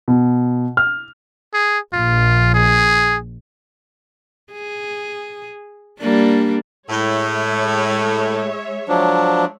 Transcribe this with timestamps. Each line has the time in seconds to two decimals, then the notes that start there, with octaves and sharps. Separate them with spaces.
0.08 B2
0.77 F6
1.54 G#4
1.93 A#1 F4
2.54 G#4
4.52 G#4
5.99 G3 A#3 D4
6.89 A2 G#3 C#5 E5
8.89 F3 F#3 D4